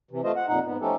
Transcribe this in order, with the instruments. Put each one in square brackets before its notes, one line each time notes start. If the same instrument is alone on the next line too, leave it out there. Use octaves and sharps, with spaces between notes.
[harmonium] C3 E3
A3 F4 C5 D#5
F#5
F2 A#2 D#4 F#5
G#2 B3
F3 A3 C#4 D#4 G4 A4